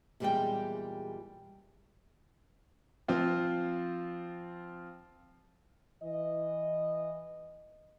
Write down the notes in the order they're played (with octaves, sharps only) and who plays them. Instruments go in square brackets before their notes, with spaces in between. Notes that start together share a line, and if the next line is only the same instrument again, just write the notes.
[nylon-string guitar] E2 A#2 G3 G#3 D5 G5
[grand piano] F3 C4 F4
[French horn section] E3 D#5